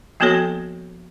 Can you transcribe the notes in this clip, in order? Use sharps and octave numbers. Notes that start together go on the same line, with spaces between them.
F3 A#3 B3 F#4 A4 C#5